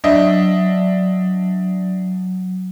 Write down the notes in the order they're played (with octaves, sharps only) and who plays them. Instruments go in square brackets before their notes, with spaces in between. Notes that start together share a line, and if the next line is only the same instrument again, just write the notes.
[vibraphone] F#3 [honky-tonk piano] D4 D#5 E5